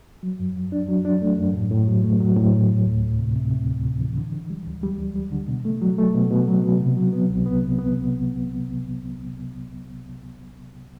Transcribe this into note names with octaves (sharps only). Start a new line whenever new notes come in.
F#3
F#2
F#2
D4
F#3
D4
A3
F#2
A2
A2
F#3
A3
F#3
A2
A2
A2
D2
D2
C3
C3
C3
D2
C3
E3
D3
D3
G3
D2
G3
D2
G3
D3
B2
A3
F#3
A3
B2
B2
F#3
B2
C3
F#3
B3
C2
B3
C3
B3